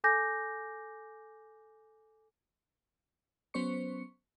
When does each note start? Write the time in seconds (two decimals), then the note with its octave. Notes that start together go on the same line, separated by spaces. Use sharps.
0.04 A4 G#5 D6 G6 A#6
3.54 F#3 B3 C#4 C5 C#6 C#7